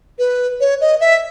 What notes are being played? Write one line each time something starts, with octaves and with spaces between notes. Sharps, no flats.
B4
C#5
D#5
E5